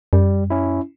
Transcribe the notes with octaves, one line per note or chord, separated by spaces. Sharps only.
F#2 G3
C#4 E4